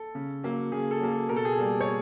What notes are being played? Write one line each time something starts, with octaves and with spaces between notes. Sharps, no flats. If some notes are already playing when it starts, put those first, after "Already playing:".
Already playing: A4
C#3
F#3 A#3
C#3 G#4
A4
F#3 A#3
A4
B2 A#4
A4
G#4
A4
G3 A#3
C#5